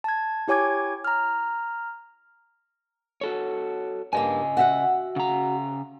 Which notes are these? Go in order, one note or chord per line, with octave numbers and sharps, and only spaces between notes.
A5 G#6
E4 G4 C#5 G#5 D6 G#6
A#5 F6
F#4 A4 C#5
G2 C#3 A#3 D#5 G#5
F#4 E5 F#5
C#3 A#5